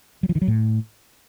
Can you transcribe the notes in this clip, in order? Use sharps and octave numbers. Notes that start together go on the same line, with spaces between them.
F#3
F3
D#3
F#3
A2